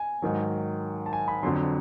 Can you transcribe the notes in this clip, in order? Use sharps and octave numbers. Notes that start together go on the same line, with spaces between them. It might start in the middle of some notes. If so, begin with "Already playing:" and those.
Already playing: G#5
G#2 D#3 F#3
A5
G#5
B5
F2 D3 F#3 C6